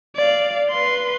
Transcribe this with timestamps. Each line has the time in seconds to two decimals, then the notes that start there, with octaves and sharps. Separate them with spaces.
0.16 D5 F5
0.70 B4 C6